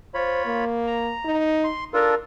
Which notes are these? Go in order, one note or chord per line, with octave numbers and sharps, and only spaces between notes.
F4 C5 C#5 B5
A#3
A#5
D#4
C6
D4 F4 A4 A#4